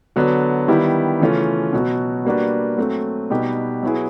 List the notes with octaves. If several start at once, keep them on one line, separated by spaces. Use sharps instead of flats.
D3 F#3 B3 D4
D#3 G3 B3 E4 G4
C#3 E3 A3 C#4 F4
B2 F#3 B3
G3 A#3 D4 F#4 B4
F#3 A3 C4
B2 G3 B3 D#4 G4
F#3 B3 E4 G#4